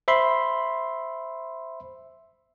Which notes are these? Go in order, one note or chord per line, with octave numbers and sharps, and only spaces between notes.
C5 E5 B5 C6